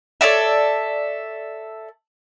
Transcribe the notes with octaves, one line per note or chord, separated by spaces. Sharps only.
A4 C#5 D5 E5